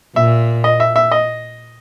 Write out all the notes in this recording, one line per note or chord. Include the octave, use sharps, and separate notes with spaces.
A#2 E5
D#5
E5
E5
D#5